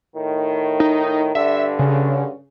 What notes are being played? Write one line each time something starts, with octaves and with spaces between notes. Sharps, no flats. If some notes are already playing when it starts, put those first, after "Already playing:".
A2 D#3
D#4
G2 D3 E5
C#3